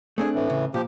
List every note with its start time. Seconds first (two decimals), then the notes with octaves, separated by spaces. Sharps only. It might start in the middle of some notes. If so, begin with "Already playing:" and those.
0.18 A3 C4 D4 G#4
0.35 A2 E3
0.50 C#3
0.74 A#2 F3 G4